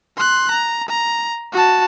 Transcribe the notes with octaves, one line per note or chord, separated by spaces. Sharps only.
C6 F#6
A#5
A#5
F#4 A5